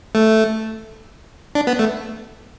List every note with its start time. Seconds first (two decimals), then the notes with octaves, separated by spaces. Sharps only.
0.15 A3
1.55 D4
1.67 B3
1.79 A3